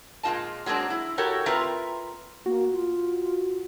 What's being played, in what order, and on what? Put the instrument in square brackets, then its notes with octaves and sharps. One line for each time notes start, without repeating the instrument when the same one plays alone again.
[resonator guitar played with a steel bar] A#2 G#3 C4 F4 D#5 A5
F#3 G#3 A#3 C4 D4
E4
F#4 G4 A4 A#4 C#5
C4 F4 A#4 B4 E5 A#5
[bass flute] A#3 [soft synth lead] F#4
[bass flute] F4